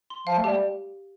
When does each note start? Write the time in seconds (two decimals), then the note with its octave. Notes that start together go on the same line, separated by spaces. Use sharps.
0.10 C6
0.27 F3 F5
0.38 A3
0.44 G3 G4